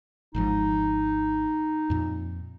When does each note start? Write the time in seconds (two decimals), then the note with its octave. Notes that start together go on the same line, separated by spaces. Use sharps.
0.35 G#1 G#2 F3 D#4
1.90 F2 A#2